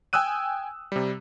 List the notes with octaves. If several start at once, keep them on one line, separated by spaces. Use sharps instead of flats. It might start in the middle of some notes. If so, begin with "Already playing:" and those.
G5 G#5 D#6 E6 F#6 D#7
C3 G3